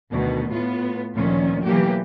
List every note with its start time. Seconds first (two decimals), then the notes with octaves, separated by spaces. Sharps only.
0.11 D2 B2 D#3
0.52 A2 B3 F4
1.15 D2 A#2 D#3 F3 C#4
1.64 B2 E3 F#3 A3 A#3 G4